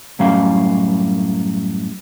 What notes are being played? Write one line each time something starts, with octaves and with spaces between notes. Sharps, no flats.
F#2 A2 F#3 G3 C#4 F5